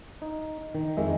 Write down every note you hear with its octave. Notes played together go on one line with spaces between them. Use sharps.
D#4
D#3
F2 D#3 G#3 E5